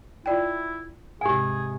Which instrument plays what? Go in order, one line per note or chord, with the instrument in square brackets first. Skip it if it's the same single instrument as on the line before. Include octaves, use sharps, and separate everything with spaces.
[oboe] E4 [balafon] F4 D5 G5
[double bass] G#2 C3 [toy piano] G4 G#5 [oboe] G#4